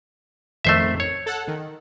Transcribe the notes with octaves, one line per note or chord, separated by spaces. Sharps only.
A1 F2 D#3 A3 C5 E5
C#5
A4 F#5
D#3